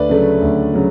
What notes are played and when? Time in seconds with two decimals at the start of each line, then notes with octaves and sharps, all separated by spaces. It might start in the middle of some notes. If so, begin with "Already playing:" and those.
Already playing: D2 B4 D5
0.09 C#3 F#3 A3
0.42 D2
0.74 C#3 F#3